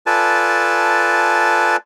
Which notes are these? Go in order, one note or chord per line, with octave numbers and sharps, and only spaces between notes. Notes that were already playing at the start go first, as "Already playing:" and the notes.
F4 A4 B4 D5 G#5 A5